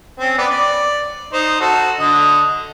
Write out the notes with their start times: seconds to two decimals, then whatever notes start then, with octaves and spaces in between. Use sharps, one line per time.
0.19 C4 C#4
0.38 B3 D5
0.50 D5
1.33 D#4 C5
1.60 F#4 A4
1.99 D3 D#5